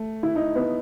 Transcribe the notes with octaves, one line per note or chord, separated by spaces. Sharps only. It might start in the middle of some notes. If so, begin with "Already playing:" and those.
Already playing: A3
E4
D#4
B3